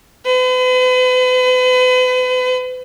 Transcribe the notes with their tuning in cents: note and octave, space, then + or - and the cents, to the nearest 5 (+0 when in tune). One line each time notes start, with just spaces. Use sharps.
B4 +40